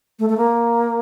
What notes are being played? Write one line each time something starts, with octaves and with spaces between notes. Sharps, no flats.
A3
A3
A#3